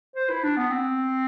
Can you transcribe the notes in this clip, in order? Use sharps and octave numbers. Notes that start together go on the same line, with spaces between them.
C5
E4
D4
B3
C4